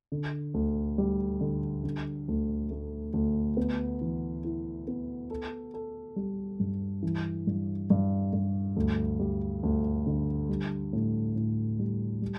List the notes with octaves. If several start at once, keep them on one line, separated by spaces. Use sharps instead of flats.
D3
D2
G3
D3
D3
D2
A3
D2
B3
E3
E4
B3
A4
A4
G3
G2
E3
G2
G2
G2
D2
G3
D2
D3
G3
A2
A2
G3
G3